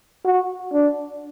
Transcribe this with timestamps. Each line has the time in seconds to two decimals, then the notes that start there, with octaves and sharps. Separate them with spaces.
0.25 F#4
0.73 D4